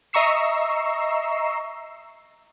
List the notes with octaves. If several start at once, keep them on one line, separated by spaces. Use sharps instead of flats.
D#5 E5 A#5 C#6 E6 C7